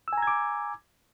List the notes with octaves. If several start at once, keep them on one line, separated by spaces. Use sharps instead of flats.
G#5 A#5 D6 E6 G#6